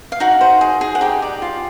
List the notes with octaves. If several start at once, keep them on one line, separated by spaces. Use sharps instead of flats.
F5
D#4 F#4 F#5
C5
G#4
G#4
F#5
D#4 G4 G5
D5
F4